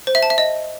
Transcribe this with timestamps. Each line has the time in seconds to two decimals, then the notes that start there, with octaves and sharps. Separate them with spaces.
0.07 C5
0.15 E5
0.23 A5
0.30 E5
0.38 D#5